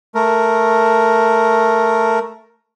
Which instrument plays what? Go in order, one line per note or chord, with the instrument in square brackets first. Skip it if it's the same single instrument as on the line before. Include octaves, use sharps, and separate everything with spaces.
[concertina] A3 A#4